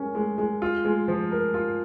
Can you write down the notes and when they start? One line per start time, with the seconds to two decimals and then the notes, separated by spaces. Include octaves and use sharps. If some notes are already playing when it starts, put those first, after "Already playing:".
Already playing: G#3 C#4 A#4
0.15 G#3
0.38 G#3
0.62 F4
0.85 G#3
1.08 F3
1.32 A#4
1.54 F4